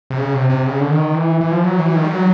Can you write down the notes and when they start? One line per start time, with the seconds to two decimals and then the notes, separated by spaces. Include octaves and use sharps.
0.10 C3
0.18 C#3
0.34 C3
0.50 C3
0.66 C#3
0.81 D3
0.90 D#3
1.14 E3
1.41 E3
1.52 F3
1.63 F#3
1.79 E3
1.96 D#3
2.04 G3
2.12 F#3